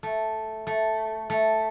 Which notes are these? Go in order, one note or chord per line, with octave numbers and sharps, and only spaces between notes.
A3
A3
A3